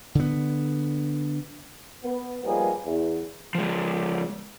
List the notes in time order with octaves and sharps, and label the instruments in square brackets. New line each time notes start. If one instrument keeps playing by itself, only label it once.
[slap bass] D3 B3
[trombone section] B3
D#2 F3 G3 A#3 B3 G#4
E2
[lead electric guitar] F3 G#3